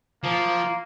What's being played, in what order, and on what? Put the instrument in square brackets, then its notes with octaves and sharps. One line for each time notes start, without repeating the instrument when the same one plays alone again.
[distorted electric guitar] F3 [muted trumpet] A#3